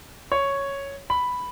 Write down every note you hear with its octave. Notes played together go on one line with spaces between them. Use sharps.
C#5
B5